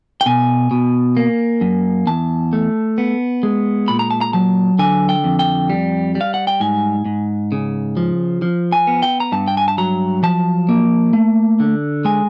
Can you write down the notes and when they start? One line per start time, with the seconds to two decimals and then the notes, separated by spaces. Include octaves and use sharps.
0.21 G5
0.26 B2 G#5
0.71 B2
1.17 A#3
1.61 F#2
2.07 E2 A5
2.53 A3
2.98 B3
3.43 G#3
3.88 A#2 B5
3.99 A#5
4.11 A5
4.21 A#5
4.33 F#3 A5
4.79 D3 G#5
5.09 G5
5.24 F2
5.39 G5
5.70 G3
6.15 G3
6.21 F5
6.34 F#5
6.47 G5
6.60 G#2 G#5
7.05 G#2
7.52 C#3
7.97 F3
8.42 F3
8.72 G#5
8.87 B3
9.03 G5
9.20 A#5
9.32 G2 A5
9.48 G5
9.57 G#5
9.68 A5
9.78 F#3 A#5
10.23 F3 A5
10.69 A#3
11.13 A3
11.60 D3
12.05 G#3 G#5